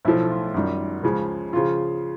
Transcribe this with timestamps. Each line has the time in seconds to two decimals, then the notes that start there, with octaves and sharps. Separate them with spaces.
0.05 B1 A2 F3 A3 E4
0.30 F4
0.54 F#2 D#3 G3
1.03 C#2 C#3 F3 G#3
1.53 C#3 F3 F4